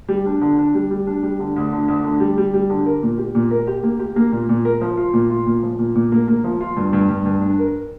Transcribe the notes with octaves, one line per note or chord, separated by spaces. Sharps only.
G3
D4
D3
D4
G3
G3
D4
G3
D3
D2
D3
D2
D3
G3
G3
G3
D3
A#4
A#2
G4
A#2
A#4
G4
A#3
G4
A#3
A#2
A#2
A#4
F3
F4
A#2
F4
A#2
F3
A#2
A#2
A#3
A#3
F3
F4
G2
G2
G2
G2
D4
A#4